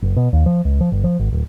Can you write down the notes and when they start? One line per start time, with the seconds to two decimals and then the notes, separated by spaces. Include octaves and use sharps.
0.02 F#1
0.17 B2
0.33 D#2
0.46 F3
0.65 C#2
0.81 F3
0.92 G1
1.04 F3
1.19 G#1
1.32 D1